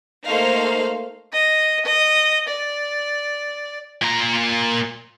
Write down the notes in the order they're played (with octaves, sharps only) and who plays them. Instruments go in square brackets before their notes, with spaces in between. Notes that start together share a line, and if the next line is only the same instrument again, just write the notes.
[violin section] A3 A#3 D#4 C5 F5
[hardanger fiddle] D#5
D#5
D5
[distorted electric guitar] A#2 A#5